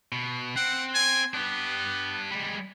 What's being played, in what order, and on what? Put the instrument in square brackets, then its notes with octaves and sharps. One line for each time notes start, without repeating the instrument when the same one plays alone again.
[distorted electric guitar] B2
[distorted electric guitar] C4 [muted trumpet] F#5
[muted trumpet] G#5
[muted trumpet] B3 [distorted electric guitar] D4 G4
[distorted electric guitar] G3 G#3